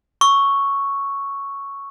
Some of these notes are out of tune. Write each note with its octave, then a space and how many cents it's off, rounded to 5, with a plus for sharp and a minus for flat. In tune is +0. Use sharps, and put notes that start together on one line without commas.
C#6 +0 E6 +5